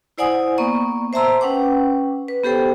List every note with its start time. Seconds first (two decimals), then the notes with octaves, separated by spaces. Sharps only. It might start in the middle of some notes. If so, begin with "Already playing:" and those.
0.18 E4 C5 D5 F#5 G#5 D#6
0.58 A#3 B3 D5 C#6
1.13 C5 E5 A5 A#5 C6 E6
1.41 C#4 B4 F#5 G5 D6
2.28 B4
2.44 B3 G4 A4 C5 G5